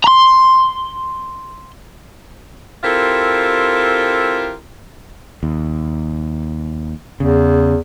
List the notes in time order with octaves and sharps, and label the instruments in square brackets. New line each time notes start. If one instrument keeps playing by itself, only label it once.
[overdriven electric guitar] A#5 C6
[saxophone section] C4 E4 F4 G4 A4 A#4
[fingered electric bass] D#2
[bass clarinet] E2 [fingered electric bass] C#3